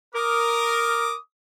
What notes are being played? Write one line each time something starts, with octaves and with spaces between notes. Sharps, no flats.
A#4 D6 D#6